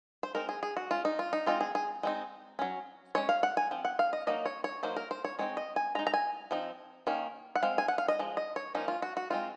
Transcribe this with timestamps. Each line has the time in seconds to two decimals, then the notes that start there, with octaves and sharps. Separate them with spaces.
0.23 C5
0.35 G#3 C4 D#4 A#4
0.49 G#4
0.63 G#4
0.77 F#4
0.91 G#3 C#4 F4
1.05 D#4
1.19 F4
1.33 D#4
1.46 G#3 C4 D#4 F4
1.61 G#4
1.75 G#4
2.03 G#3 C4 D#4
2.59 F#3 C#4
3.15 G#3 C#4 C#5
3.29 F5
3.43 F#5
3.57 G#5
3.71 F3 C4
3.85 F#5
3.99 F5
4.13 D#5
4.27 F#3 A#3 D#4 D#5
4.46 C#5
4.64 C#5
4.83 F#3 A#3 D#4 C5
4.96 A#4
5.11 C5
5.24 C#5
5.39 G#3 C4 D#4 C#5
5.57 D#5
5.76 G#5
5.95 G#3 A#5
5.99 D#4
6.07 A#5
6.14 G#5
6.51 F3 C4 D#4
7.07 D#3 A#3 C#4
7.55 F#5
7.63 G#3 C4 F5
7.78 G#5
7.88 F#5
7.98 F5
8.08 D#5
8.19 F3 G#3
8.37 D#5
8.56 C#5
8.75 F3 A#3 C#4 D#4
8.88 F4
9.02 F#4
9.17 F#4
9.30 G#3 C4 D#4 F4